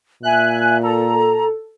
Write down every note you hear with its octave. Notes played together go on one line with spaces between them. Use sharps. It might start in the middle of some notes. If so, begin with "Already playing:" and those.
A#2 E5 G#5 F#6
A4 A#5